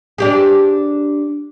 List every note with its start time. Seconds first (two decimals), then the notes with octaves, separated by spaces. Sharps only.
0.18 D4 G4 G#4